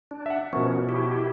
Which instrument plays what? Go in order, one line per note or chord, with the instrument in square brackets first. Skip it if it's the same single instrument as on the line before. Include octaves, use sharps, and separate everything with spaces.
[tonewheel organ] D4
[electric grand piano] E5 F#5
[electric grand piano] B2 A#4 C#6 [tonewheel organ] F3 B3 C#4
[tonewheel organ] E4 G4